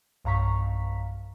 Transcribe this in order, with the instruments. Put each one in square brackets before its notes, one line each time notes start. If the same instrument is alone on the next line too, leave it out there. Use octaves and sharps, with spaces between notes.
[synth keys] B1 G2 F5 A#5 C#6 B6